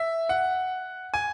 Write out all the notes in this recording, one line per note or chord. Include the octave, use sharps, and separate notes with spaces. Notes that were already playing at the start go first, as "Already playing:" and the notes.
Already playing: E5
F#5
G#5